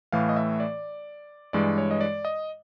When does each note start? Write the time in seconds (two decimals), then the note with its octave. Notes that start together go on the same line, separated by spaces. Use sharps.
0.12 A2 E3 A3 F5
0.29 D#5
0.37 E5
0.60 D5
1.53 G2 E3 G#3 D5
1.78 C#5
1.91 D#5
2.01 D5
2.25 D#5